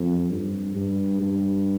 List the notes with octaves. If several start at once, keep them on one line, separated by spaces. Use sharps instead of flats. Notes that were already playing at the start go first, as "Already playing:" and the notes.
Already playing: F2
G2
G2
G2